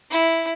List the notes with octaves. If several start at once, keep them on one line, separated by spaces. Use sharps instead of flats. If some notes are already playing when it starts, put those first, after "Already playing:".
E4